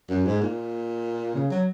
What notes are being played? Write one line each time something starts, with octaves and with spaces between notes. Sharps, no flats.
F#2
G#2
A#2
C#3
F#3